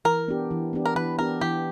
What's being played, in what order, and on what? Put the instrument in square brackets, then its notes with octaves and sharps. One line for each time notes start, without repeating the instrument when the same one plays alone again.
[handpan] E3 [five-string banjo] A#4
[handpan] B3 D4 G4
E3
B3 D4 G4
[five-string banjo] A#4
[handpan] E3 [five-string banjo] B4
[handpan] B3 D4 G4 [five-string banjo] A#4
[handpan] E3 [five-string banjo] G4